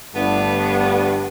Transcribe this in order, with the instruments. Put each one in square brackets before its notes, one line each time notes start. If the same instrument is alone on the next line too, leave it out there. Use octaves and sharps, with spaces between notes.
[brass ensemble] G1 D4 [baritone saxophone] G2 [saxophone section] A3 B3